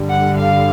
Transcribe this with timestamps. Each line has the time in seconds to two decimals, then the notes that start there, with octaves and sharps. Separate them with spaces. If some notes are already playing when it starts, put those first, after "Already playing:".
Already playing: G2 D3 G3
0.09 F#5
0.38 F5